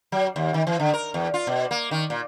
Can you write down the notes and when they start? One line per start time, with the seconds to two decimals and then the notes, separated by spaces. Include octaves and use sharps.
0.12 F#3
0.36 D#2
0.54 D#3
0.67 E3
0.80 D3
0.94 A#4
1.14 E2
1.34 F4
1.47 B2
1.71 A#3
1.91 D#3
2.10 A#2